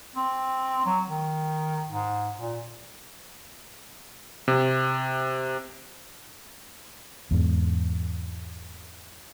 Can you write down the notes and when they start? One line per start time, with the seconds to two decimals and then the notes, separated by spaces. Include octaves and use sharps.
0.16 C4
0.85 F#3
1.08 D#3
1.88 G#2
2.40 A#2
4.48 C3
7.31 E2 G#2